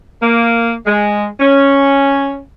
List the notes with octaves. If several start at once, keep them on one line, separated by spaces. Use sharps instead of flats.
A#3
G#3
C#4